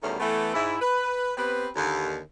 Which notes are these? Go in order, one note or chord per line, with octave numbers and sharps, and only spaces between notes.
E2 B2 D#3 G3 A3 C#4
E3 A3 B3
G#2 E4
B4
B3 C4 G4 B4
D#2 D3